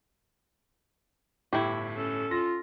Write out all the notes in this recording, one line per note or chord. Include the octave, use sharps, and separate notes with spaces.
G1 A2 E4 G4
C#4 A4
F4 A#6